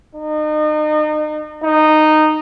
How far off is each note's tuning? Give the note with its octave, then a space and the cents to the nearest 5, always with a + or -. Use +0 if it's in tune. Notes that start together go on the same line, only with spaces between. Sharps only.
D#4 -35
D#4 -10